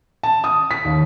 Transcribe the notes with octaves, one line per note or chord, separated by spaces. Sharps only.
A5
D#6
B6
D#2